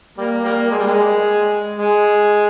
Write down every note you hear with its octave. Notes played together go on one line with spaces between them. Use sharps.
G3 A#3
G3 A#3
G#3
G3
G#3
G#3